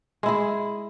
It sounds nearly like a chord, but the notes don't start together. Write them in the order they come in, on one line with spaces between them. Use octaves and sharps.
G#3 E4 G#4